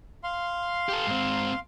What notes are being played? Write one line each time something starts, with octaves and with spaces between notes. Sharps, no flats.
F5 C6
G4 A4
G#2 C4